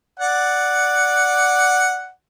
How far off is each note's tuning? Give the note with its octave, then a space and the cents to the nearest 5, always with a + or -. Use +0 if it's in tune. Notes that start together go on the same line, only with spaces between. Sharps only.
D5 +0 F#5 +0